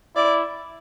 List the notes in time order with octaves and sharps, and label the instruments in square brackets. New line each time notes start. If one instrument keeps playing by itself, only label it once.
[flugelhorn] E4 [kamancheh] D5